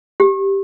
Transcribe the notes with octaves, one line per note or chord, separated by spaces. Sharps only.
G4